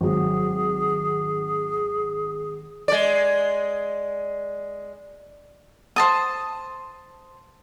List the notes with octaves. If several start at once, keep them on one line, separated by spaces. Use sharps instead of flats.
G#1 F#3 G#4
G#3 D5
C5 A5 D#6